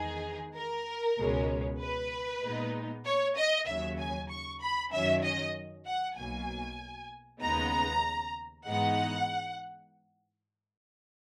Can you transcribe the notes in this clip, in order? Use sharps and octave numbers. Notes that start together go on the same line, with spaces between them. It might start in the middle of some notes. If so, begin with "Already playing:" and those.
Already playing: E2 D#3 G#3 D#4 G#4
A#4
C#2 B2 G#3 C#4
B4
A#2 G#3 B3 D#4
C#5
D#5
D#2 C#3 F#3 C#4 E5
G#5
C#6
B5
F#2 D#3 F#3 C#4 E5
D#5
F#5
B1 B2 F#3 A#3 G#5
D#2 C#3 G#3 B3 D#4 A#5
G#2 E3 G#3 B3 D#4 F#5